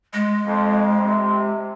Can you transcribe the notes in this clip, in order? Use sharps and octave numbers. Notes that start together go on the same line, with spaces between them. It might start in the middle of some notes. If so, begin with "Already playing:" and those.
G#3
F2
C3